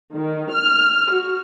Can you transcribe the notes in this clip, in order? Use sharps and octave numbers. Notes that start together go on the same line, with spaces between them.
D#3
F6
F#4